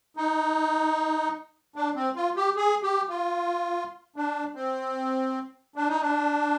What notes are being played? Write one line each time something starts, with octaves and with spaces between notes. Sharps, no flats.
D#4
D4
C4
F4
G4
G#4
G4
F4
D4
C4
D4
D#4
D4